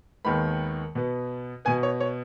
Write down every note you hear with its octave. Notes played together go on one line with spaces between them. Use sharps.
D#2 D#3 G#3 B3 B5
B2 B3
B2 B3 G#5
C#5
C#5